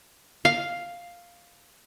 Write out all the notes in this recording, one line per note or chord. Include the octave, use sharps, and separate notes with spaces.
F5